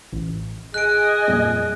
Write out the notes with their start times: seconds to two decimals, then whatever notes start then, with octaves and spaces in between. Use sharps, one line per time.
0.13 A1
0.74 G#4 D#5 G#5 F#6 D7
1.28 F2 A#2 G3